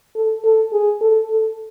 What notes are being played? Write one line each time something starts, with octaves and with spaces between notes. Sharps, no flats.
A4
A4
G#4
A4
A4